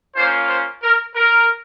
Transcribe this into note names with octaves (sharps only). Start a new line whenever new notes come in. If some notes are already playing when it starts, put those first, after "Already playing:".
A#3 C#4 F4 C5
C5
A#4
A#4